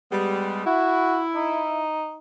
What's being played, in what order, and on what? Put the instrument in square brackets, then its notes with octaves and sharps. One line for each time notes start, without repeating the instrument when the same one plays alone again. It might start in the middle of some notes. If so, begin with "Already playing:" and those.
[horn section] G3 G#3 B3
[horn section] E4 [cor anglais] F#4
[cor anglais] D#4